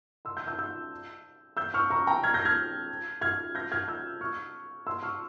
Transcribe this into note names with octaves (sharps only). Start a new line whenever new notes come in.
C6 E6
E6 G6
E6 G6
E6 G6
E6 G6
C#6 F6
A#5 C#6
G5 A#5
F6 G#6
G6 A#6
F6 G#6
F6 G#6
G6 A#6
F6 G#6
E6 G6
C#6 F6
C6 E6
C#6 F6